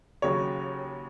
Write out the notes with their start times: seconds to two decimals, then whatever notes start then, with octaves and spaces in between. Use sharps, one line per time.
0.22 D#2 C#3 F#3 C#5